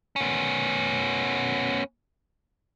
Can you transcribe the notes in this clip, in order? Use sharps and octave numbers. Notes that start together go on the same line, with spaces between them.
B3 C#4